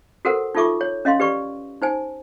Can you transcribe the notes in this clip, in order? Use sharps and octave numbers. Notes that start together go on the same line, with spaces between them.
F#4 A4 A#4 C5 F#5
D#4 F4 A4 E5 C#6 D6
C#5
C#4 D#5 F5 C6
G4 B4 D5 C#6
D#4 C5 G#5